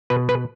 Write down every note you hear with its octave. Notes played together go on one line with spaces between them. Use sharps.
B2 B4
B4